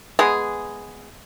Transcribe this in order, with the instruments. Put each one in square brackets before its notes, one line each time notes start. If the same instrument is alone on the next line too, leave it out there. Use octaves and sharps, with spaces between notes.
[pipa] G#3 B3 G#4